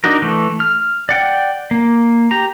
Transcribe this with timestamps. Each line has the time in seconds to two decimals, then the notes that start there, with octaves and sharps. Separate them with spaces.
0.04 D4 D#4 F#4 A#4
0.22 E3 A3
0.60 F6
1.09 D5 F#5 G5
1.71 A#3
2.31 G4 A#5